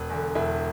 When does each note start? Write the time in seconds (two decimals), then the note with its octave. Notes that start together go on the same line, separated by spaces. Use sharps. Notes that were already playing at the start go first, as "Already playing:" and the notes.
Already playing: E1 B4
0.10 E2 D3
0.35 E1 E4